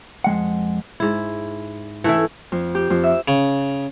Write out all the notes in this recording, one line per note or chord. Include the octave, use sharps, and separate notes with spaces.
F2 G#3 F#5
G#2 E4
E3 A3 E4
F2
G4
F2
E5
C#3